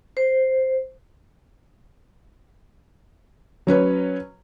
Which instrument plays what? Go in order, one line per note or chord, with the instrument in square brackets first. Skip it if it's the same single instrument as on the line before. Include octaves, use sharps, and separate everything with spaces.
[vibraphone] C5
[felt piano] F#3 C#4 B4 C#5